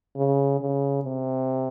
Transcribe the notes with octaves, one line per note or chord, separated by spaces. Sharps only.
C#3
C#3
C3